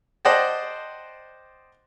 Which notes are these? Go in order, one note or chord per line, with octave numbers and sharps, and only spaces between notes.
C5 D5 D#5 F#5 G5 A5